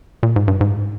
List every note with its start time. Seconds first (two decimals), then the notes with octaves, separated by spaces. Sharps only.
0.23 A#2
0.36 G#2
0.48 G2
0.61 G#2